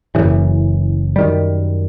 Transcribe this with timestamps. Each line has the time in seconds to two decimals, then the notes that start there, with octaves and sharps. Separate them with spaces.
0.15 F#1 F#2 C#3 E3
1.16 F#2 D#3 G3